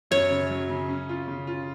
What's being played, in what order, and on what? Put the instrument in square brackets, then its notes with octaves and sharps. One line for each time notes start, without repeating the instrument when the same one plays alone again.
[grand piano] F#2 [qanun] C#5
[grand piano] C#3
F#3
C#3
C#4
F4
C#3
F4